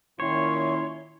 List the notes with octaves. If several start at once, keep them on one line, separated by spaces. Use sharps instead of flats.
A#2 D#3 C#4 E4 C#5 C6